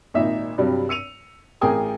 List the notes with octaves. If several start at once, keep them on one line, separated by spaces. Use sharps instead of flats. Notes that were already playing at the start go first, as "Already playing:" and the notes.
G#1 A#2 D#4 E5
G2 C3 F#3 G3
E6 C#7 D#7 F7
A1 G#4 A#4 G5 G#5 D#6